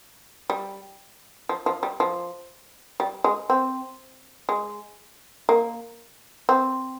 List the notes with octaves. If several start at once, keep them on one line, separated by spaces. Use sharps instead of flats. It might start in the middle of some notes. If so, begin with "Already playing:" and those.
G3
F3
F3
G3
F3
G3
G#3
C4
G#3
A#3
C4